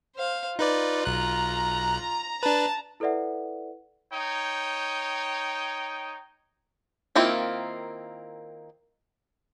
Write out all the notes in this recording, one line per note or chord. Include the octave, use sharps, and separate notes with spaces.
C5 F5
D#4 F4 B4 D5
B1 A#5 F#6
D4 B4 A5
E4 A4 B4 D5 E5 F#5
D#4 C#5 G5
D#3 A#3 C4 E4 F4